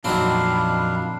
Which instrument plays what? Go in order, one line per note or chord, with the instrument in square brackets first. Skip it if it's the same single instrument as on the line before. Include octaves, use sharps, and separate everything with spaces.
[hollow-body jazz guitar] F2 A#2 [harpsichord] D#3 F#3 C4 [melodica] D4 F5 [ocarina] B5